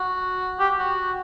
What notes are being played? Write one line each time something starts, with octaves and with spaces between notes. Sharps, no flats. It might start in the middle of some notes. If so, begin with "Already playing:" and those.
Already playing: F#4
G4
F#4